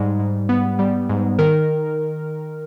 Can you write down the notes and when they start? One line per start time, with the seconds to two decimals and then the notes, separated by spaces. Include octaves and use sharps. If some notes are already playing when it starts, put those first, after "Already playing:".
Already playing: G#2 G3
0.20 G#2
0.49 B3
0.79 G3
1.09 G#2
1.39 D#3 A#4